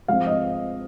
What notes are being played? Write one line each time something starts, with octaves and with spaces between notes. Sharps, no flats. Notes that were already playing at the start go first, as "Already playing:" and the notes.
G#2 F3 G#3 C4 F5
D#5